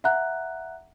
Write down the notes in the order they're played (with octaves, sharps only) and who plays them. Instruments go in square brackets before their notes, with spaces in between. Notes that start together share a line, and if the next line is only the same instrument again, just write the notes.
[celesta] E5 F#5 A#5 F#6